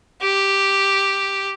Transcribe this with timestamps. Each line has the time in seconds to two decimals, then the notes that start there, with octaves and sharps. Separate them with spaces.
0.21 G4